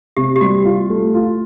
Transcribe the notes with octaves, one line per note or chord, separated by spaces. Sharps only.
C3 G4
G4
G3 F#4
F4
A3
F4